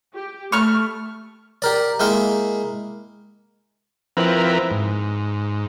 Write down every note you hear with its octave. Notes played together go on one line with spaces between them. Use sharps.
G4
A3 C#6 F6
G4 A#4 D5
G#3 A#3 E4 F5 G5
F3 C4 E4 A#4 B4
G#2